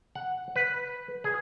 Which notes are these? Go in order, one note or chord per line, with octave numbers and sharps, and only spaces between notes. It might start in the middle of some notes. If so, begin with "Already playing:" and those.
F#5
B4
G#4